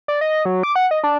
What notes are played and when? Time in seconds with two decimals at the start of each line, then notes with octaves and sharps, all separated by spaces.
0.08 D5
0.21 D#5
0.45 F#3
0.63 D6
0.76 F#5
0.91 D#5
1.04 D4